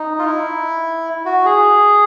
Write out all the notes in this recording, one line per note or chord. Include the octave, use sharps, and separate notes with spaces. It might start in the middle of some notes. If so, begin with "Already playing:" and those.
Already playing: D#4
F4
E4
F#4
G#4